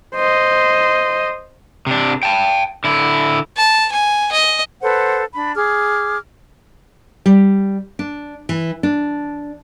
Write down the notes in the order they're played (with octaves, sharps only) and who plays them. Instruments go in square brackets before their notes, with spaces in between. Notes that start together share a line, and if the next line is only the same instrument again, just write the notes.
[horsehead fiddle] C5 D#5
[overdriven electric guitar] C3 D4
G5 A5
D3 E4
[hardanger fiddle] A5
G#5
D#5
[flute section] A4 B4 C5 F#5
D4 B5
G#4 D6 F6
[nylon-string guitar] G3
D4
E3
D4